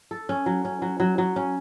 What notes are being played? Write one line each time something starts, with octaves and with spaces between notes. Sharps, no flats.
A4
C#4
F#3
C#4
F#3
F#3
F#3
C#4